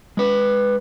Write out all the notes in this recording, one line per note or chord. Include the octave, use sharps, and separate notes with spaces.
G#3 B4